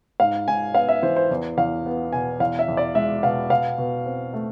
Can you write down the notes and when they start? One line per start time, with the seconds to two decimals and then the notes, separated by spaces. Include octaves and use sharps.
0.20 G#2 F5
0.47 G#2 G#5
0.75 B3 F5
0.89 E5
1.03 E3 C5
1.17 C5
1.31 E2
1.58 E2 F5
1.86 B3
2.13 B2 G#5
2.40 E2 F5
2.59 E5
2.68 E2
2.77 D5
2.95 G#3 E5
3.23 B2 F5
3.50 B2 F5
3.78 B2
4.06 C4
4.34 A3